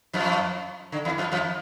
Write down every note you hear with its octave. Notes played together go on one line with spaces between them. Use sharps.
F2 F3
D3
E2 E3
F2 F3
F2 F3